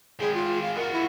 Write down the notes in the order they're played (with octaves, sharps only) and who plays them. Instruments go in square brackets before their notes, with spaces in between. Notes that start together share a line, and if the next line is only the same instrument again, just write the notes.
[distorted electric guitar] G#3 G5 [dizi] G#4
[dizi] F4
F5
[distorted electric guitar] F4 F#4 [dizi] A#4
[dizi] E4